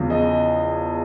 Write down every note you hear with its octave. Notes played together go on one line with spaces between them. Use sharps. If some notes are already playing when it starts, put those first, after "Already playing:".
Already playing: E2 C#3 F3
D#5